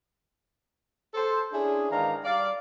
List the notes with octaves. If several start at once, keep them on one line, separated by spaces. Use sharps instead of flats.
A4 C5
C#4 D4 E4 G#4
G#2 D#3 E3 D4 F5 A#5
G3 D5 F5